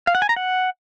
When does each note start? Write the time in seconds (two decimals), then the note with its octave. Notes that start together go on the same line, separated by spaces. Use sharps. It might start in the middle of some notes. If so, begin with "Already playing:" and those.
0.07 F5
0.15 F#5
0.22 G#5
0.29 A#5
0.36 F#5